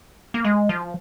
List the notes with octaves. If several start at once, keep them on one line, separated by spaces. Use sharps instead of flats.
A#3
G#3
F3